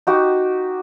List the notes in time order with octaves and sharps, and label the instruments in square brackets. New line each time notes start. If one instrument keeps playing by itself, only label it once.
[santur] D#4 F#4 G4